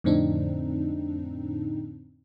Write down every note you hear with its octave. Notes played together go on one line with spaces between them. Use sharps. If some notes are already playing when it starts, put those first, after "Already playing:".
F2 A2 D3 C4 D4 D#4